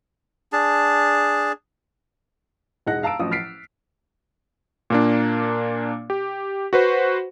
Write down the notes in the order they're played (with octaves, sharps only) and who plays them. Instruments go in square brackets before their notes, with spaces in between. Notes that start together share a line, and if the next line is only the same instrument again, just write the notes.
[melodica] D4 G#4 A5
[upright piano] E1 G#3 D#4 F#5 F#6 A#6
F5 A5 A#5 E6 D7
A1 F3 F#3 D#6
F6 A6 B6 C7 D7
[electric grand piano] A#2 A#3 D4
G4
F#4 B4 C5